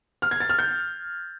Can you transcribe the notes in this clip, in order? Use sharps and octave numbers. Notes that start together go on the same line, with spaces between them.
F6
G#6
A6
F6
G6